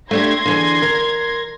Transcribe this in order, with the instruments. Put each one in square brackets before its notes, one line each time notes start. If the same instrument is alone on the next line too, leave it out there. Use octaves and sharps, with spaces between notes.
[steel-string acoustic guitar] A3 D4 G4 [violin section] C6 G#6 A#6
[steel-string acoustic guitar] D3 E3 G#4
A#4